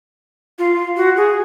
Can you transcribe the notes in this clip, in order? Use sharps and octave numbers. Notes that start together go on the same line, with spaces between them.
F4
F#4
G#4